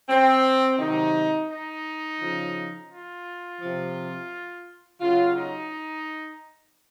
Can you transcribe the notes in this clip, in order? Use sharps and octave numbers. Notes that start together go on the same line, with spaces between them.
C4
C3 D#3 F#3 D#4
D#4
C#3 F3
F4
C3 F3
C#3 F#3 F4
D#4